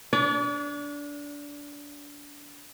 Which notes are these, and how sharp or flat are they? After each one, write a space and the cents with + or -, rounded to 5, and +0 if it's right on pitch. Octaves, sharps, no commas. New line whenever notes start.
D4 -20 D5 -45